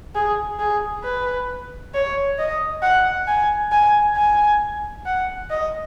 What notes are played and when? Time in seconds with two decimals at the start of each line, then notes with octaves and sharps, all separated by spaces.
0.15 G#4
0.60 G#4
1.04 B4
1.95 C#5
2.39 D#5
2.83 F#5
3.28 G#5
3.72 G#5
4.16 G#5
5.06 F#5
5.51 D#5